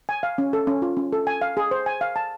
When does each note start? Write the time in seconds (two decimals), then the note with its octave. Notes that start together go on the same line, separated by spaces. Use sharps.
0.09 G#5
0.23 F5
0.38 C#4
0.53 A4
0.67 C#4
0.82 F4
0.97 C#4
1.13 A4
1.27 G#5
1.42 F5
1.57 G#4
1.71 C5
1.86 G#5
2.01 F5
2.16 A5